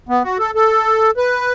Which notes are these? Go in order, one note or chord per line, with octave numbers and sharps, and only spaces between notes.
B3
F#4
A4
A4
B4